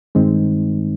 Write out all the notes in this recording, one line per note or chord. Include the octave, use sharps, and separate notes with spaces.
G2 D#3 G#3 C4 D#4